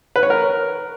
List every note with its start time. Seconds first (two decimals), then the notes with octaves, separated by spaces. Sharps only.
0.16 B4
0.23 C#5
0.30 A#4